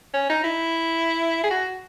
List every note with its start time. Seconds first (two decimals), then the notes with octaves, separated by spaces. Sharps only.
0.14 C#4
0.30 D#4
0.44 E4
1.44 G#4
1.51 F#4